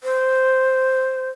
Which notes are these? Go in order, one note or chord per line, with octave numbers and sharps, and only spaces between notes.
C5